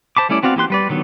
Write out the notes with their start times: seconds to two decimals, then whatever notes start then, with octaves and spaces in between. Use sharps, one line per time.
0.17 C5 A5 B5 D6
0.29 G3 A3 C#4 E4 D5
0.43 B3 C4 F#4 D5 F5
0.56 E3 A#3 G4 C6 F#6
0.70 G3 B4 D5
0.89 D3 D#3 F#3 B3